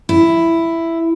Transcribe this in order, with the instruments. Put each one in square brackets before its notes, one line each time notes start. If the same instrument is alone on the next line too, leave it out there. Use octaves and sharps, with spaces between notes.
[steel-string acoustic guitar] E4